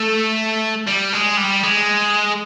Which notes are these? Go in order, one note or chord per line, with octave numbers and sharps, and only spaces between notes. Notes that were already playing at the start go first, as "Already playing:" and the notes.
Already playing: A3
G3
G#3
G3
G#3